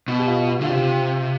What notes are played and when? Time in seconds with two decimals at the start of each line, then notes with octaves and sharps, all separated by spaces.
0.08 B2
0.19 G4
0.28 F4
0.49 F4
0.61 D3 F4
0.69 C3 G4